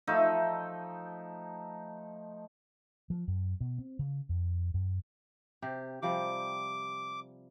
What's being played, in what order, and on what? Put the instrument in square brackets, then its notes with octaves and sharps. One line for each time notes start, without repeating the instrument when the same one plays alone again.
[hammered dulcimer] F3 A3 D#4 E5
[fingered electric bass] F3
F#2
B2
C4
C#3
F2
F#2
[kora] C3 G4
[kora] C3 F3 G3 [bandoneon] D6